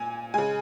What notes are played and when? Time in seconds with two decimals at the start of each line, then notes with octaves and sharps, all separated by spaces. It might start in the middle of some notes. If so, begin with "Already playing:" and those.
Already playing: A#2 G#5
0.34 C#3 G#3 G#5